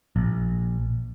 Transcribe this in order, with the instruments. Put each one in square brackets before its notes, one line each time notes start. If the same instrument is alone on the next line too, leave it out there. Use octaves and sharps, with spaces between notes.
[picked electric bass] A#1